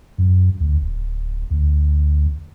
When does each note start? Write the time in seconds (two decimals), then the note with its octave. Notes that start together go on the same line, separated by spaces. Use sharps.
0.18 F#2
0.60 D2
0.81 D1
1.50 D2